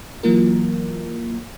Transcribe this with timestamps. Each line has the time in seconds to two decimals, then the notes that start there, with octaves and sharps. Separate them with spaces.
0.23 E3 F#3 A#3 F4 A#4